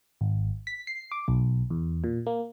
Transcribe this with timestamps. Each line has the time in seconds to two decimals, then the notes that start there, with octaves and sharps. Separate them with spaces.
0.21 G#1
0.67 B6
0.87 C7
1.12 D6
1.28 B1
1.70 E2
2.04 A#2
2.27 A#3